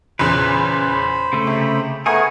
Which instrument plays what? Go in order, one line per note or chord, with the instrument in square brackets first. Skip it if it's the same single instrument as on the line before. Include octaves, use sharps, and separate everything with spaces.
[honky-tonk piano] E2 A#2 C#3 [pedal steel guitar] B4 [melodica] C5 B5
[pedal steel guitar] C#3 A3
[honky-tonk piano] C3
[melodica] A3 B3 [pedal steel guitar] G#4 C#5 [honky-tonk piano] A#4 G#5 D#6